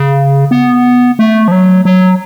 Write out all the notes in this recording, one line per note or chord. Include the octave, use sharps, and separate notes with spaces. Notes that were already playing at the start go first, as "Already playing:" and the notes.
Already playing: C#3
B3
A3
F3
F#3
F#3